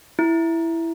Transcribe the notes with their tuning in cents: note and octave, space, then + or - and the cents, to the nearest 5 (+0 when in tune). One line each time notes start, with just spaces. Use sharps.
E4 +5